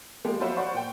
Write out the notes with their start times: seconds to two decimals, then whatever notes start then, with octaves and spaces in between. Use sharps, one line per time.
0.25 F3 G#3 A#3 G4
0.40 F3 F#3 F4 F#4 C5 E5
0.57 C5 D5 F#5 C#6
0.74 A#2 G5